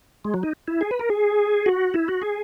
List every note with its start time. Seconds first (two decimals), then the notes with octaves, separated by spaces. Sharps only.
0.25 G#3
0.34 F#3
0.43 D#4
0.68 E4
0.81 G#4
0.91 B4
0.99 A#4
1.10 G#4
1.66 F#4
1.94 E4
2.08 F#4
2.22 G#4